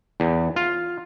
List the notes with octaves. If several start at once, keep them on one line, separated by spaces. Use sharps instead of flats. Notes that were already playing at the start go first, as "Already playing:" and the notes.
E2
F4